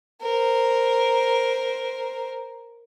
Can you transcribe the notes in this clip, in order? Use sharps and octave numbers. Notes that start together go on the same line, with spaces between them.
A#4 C5